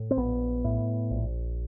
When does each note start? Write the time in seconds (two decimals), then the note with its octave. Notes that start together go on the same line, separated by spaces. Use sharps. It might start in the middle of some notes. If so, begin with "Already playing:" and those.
Already playing: A2
0.11 C4
0.17 A#1 B3
0.64 A2
1.11 A#1